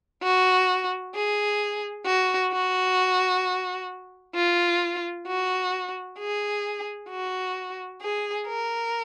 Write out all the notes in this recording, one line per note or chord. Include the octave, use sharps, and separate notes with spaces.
F#4
G#4
F#4
F#4
F4
F#4
G#4
F#4
G#4
A#4